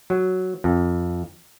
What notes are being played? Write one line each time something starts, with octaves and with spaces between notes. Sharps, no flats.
F#3
F2